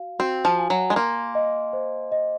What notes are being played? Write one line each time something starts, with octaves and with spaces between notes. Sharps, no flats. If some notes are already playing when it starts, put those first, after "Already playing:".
Already playing: F#4 F5
C4 F#4
F3
G#5
F#3
G#3
A#3 C6
D#5
C5
D#5